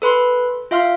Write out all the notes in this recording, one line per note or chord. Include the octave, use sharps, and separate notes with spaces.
A4 B4 B5 C6
F4 E5 F5 C6 F6